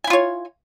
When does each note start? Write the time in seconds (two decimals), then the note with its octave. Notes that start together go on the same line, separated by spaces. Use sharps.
0.04 G#5
0.07 E4
0.10 F4
0.13 C#5